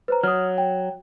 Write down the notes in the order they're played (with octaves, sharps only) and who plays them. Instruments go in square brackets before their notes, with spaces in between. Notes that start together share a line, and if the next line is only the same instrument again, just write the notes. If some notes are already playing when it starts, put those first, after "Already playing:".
[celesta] B4 C5 A#5
[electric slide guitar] F#3 [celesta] D#6 F6
[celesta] G5